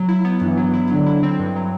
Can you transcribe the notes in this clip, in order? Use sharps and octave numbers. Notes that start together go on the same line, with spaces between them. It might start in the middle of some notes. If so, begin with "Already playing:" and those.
Already playing: F#3
E4
B3
G2 E3
F#3
E4
D3 F#3
E4
C4
G2
F#3